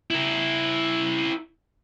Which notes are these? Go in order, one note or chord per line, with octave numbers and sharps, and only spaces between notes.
E4 A#4